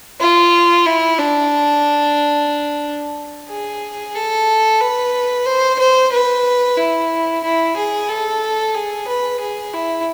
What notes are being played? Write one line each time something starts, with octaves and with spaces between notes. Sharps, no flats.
F4
E4
D4
G#4
A4
B4
C5
C5
B4
E4
E4
G#4
A4
G#4
B4
G#4
E4